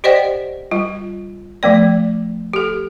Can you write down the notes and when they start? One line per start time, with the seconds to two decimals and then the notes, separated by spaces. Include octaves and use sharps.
0.04 G4 C5 D5 D#5 F#5 G5
0.71 G3 F4
1.63 F3 A3 B3 D5
2.53 G4 A4